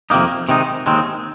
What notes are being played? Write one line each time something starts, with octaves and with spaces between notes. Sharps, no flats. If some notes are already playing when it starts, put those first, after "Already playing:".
F2 C3 D#3 A#3 D#4
C3 D#3 G#3 D#4
D#2 D#3 G#3 C4